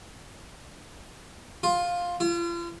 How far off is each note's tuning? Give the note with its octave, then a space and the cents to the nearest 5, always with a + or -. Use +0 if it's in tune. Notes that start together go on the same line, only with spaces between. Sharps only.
F4 +10
F4 -40